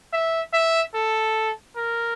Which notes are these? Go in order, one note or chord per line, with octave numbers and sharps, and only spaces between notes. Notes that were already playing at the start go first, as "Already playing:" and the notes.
E5
E5
A4
A#4